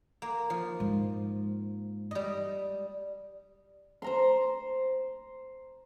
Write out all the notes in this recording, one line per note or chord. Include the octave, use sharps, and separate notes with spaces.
A#3
F3
G#2
G3 D#5
C5 A#5 C6